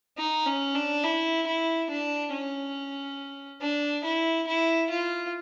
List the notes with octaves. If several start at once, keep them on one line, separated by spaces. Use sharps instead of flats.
D#4
C#4
D4
E4
E4
D4
C#4
D4
E4
E4
F4